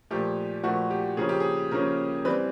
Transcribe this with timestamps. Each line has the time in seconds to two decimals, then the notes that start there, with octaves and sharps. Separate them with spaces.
0.10 A#2 F3 A3 G4
0.64 A#2 F3 A3 F#4
0.90 G4
1.17 C#3 F3 A#3 C#4 G#4
1.29 G4
1.40 G#4
1.71 C#3 F3 A#3 C#4 A#4
2.25 E3 G3 C4 B4